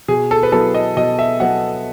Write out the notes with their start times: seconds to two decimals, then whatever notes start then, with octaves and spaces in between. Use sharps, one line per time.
0.08 B2 G#4
0.31 A4
0.43 B4
0.52 F#3 B3 E4 A4
0.75 D#5
0.96 B2 D#5
1.19 E5
1.40 F#3 B3 F#5